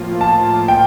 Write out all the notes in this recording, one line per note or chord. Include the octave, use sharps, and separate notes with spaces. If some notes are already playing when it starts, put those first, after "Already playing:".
Already playing: A2 F3 A#3 F4
A5
G5